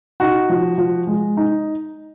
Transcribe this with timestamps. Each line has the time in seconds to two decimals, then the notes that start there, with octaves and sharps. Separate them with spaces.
0.20 D#4 F#4
0.49 F3
0.78 F3
1.07 G#3
1.37 D#4